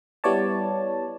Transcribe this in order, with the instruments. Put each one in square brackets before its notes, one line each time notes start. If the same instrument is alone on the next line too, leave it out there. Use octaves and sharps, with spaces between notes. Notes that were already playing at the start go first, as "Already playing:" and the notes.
[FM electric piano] G3 B3 E4 C#5 D5 A5